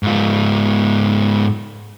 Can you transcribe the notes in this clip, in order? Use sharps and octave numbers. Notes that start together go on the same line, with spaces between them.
G#2 F4